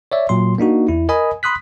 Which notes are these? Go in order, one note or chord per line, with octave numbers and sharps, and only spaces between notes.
C#5 D5 E5
A#2 F#3 C6
A#3 D4 D#4 F#4
E2 E4
A#4 D#5 G#5 B5 D#6
B5 C6 D#6 F#6 B6